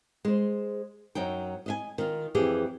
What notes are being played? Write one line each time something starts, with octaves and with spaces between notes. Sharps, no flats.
G#3 C5
F#2 F#3 D#4 G5
D#5 E5 G#5
D#3 F4
F2 E3 G4 G#4